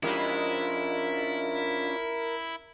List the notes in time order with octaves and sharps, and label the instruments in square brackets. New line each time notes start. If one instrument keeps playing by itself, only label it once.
[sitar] F2 G#3 G4 [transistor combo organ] C#4 D4 F4 [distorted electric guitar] E4 [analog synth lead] A#4